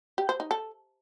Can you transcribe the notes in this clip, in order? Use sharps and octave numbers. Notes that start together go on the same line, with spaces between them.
G4
C5
D#4
A4